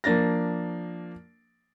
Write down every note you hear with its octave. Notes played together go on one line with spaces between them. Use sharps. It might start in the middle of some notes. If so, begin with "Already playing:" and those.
F3 A#3 D4 A6 A#6